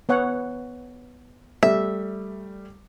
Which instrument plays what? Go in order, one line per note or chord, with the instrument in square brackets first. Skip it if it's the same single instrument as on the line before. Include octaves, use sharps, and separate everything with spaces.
[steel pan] B3 C#5 F#5
[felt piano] G3 A3 [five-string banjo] E5